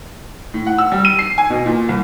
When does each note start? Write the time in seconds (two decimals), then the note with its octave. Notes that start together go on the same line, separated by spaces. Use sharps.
0.54 A2
0.66 F#5
0.78 E6
0.92 G3
1.05 D#7
1.19 C7
1.38 G#5
1.50 B2
1.66 A#2
1.89 C2